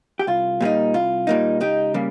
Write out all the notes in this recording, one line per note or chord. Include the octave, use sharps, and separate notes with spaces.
G4
C2 F4
A#2 G3 A#3 D#4
C2 F4
A#2 G3 A#3 D#4
C#2 D#4 G4
C#3 G3 A#3